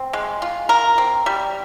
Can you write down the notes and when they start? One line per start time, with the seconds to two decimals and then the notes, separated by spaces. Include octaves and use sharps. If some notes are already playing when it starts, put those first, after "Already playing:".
Already playing: C4
0.13 G#3
0.42 F4
0.69 A#4
0.98 C4
1.26 G3